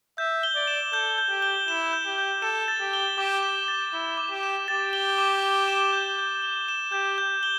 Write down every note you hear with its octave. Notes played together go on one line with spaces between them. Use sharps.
E5 G6
G7
D5
E7
A4 G6
G6
G4
G7
E4 E7
G6
G4
G6
A4 E7
A6
G4
G7
G4 D6
E7
A6
E4 G7
D6
G4
E7
G4 A6
G7
D6
G7
E7
G6
G6
G7
E7
G4 G6
G6
G7